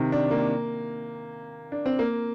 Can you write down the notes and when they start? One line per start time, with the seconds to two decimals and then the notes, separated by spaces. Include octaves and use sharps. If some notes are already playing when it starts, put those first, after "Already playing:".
Already playing: C3 D#3
0.12 D4
0.31 A#3
1.72 D4
1.86 C4
1.99 A#3